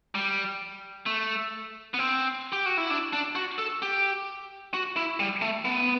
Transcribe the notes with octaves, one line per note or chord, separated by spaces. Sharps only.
G3
A3
B3
C4
G4
F#4
E4
D4
D4
F#4
A4
G4
F#4
E4
G3
A3
B3